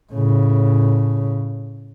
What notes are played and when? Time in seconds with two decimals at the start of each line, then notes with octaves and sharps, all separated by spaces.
0.12 A2 C#3